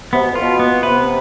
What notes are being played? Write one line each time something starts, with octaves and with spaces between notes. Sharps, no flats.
C3 B3
B2
A2 F4
B2
B3
C3 B4